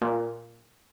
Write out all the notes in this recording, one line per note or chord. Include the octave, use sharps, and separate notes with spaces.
A#2